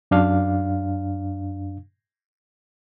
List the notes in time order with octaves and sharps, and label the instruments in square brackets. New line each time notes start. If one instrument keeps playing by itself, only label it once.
[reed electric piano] F#2 D4 F5